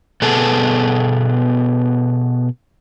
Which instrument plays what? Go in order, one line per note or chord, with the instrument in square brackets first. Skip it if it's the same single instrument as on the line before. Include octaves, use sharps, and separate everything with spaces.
[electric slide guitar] B2 B3 G#4 A4